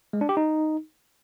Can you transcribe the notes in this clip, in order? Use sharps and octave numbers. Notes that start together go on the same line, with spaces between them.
G#3
D4
G4
D#4